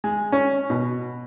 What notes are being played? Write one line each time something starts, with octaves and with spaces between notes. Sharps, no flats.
G#3
C#4
B2